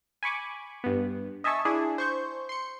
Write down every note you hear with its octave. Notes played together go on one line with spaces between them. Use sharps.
G#5 B5 C#6 D6
G2 B3
D#5 E5 G#5 A5 C#6 E6
D4 E4 G#4
C5 C#6 G6
C6 C#7